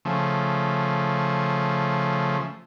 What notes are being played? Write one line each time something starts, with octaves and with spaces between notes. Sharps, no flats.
C#3 F3 A3